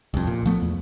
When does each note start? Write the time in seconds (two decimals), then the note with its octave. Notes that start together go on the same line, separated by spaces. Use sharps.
0.14 C2 F2
0.27 A#2
0.46 F3 A3 B3
0.62 E2